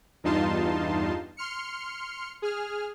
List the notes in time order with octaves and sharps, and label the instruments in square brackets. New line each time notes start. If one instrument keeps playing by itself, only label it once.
[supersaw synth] E2 G2 D#4 F4 A5 C6
C6 F6 C#7
G#4 F6